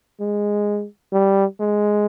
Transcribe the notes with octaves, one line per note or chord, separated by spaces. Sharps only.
G#3
G3
G#3